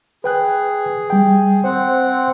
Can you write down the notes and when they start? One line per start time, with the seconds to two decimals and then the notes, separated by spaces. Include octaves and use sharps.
0.24 G#4 B4 G5 F#6
1.10 G3 G5
1.64 C4 C5 F#5